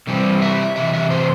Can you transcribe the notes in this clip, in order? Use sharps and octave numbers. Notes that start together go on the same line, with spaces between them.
C3 E3 G3 C4
E5
C3 E3 E5
E5
C5